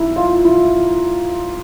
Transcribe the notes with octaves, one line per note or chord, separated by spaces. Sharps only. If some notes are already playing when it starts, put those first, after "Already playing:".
Already playing: D#4 E4
F4
E4